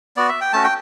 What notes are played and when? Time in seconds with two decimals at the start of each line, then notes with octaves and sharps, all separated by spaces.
0.17 B3 F#4 D5
0.29 E5
0.41 G5
0.53 A3 C#4 F#4 A5
0.63 G5